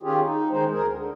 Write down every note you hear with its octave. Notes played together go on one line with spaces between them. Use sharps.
D#3 C#4 F4 G4 G#4
D#4
D#3 G#3 D#4 C5
D2 G#4 A#4
D3